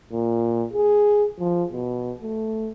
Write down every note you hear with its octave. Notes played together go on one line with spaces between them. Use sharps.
A#2
G#4
F3
B2
A3